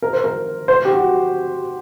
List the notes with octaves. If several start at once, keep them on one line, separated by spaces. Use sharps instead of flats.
A#4
C5
A#4
C5
G4
F#4